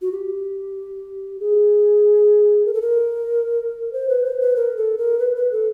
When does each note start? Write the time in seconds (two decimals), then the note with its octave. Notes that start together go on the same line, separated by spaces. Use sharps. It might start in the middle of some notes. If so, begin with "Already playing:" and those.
0.02 F#4
0.12 G4
1.40 G#4
2.65 A#4
2.74 A4
2.82 A#4
3.93 C5
4.09 B4
4.25 C5
4.40 B4
4.56 A#4
4.77 A4
4.98 A#4
5.19 B4
5.36 B4
5.52 A4